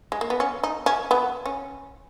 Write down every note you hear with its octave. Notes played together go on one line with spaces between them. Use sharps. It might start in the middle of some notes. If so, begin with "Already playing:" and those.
G#3
A#3
B3
C#4
D#4
C#4
B3
C#4